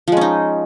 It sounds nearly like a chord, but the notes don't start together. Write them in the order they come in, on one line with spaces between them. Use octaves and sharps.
F3 G#3 C#4 D#4